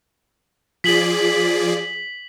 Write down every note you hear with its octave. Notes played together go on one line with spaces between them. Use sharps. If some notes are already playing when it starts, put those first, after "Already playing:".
F3 G#4 D5 B6 F#7